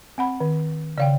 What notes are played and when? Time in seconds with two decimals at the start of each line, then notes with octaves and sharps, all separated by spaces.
0.18 C4 F#5 B5
0.40 D#3
0.98 C#3 D5 F5 G5